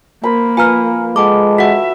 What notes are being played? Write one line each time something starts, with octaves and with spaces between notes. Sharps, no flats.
A#3 A#4 C5 B5
F3 B4 G#5 A#5 F6
G#3 A4 F#5 A5 D6
F#4 E5 F#5 B6